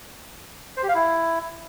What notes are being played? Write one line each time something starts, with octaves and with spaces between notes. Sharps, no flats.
C5
G4
F5
E4